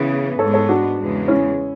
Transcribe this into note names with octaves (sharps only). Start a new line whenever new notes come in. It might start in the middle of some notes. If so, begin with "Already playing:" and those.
Already playing: C#3 E3 B3 G#4 B4
G#2 G#3 B3 A4 C#5
A4 C#5
D4 F#4
E2 C#3 G#3
C#4 E4